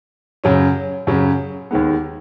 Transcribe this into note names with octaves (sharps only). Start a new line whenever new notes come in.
F#2 C#3 F#3 C#4
F#2 C#3 F#3 C#4
D#2 D#3 G#3 B3